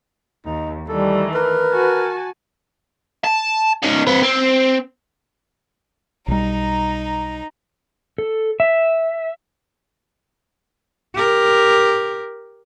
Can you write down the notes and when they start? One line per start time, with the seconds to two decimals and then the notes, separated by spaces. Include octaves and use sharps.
0.45 D#2 D#4
0.89 D#3 E3 G3 A3 A4
1.34 A#4 B4
1.73 F#4 G#5 A5
3.24 A5
3.83 C#4 D#4
4.07 C4 B4
4.23 C4
6.28 B1 G3 D#4 A#5
8.18 A4
8.60 E5
11.15 G4 A#4